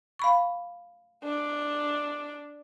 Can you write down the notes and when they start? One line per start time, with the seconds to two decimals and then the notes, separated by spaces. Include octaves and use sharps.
0.19 F5 B5 C#6
1.24 D4